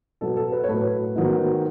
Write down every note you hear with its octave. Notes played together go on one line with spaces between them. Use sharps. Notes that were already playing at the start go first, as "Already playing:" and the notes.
B2 F#3 B3 A4
A4
B4
C#5
A2 F#3 A3 B4
G#2 D#3 F#3 B3